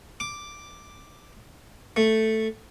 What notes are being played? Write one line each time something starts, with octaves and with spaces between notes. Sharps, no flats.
D6
A3